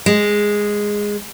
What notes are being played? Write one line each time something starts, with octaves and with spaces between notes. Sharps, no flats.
G#3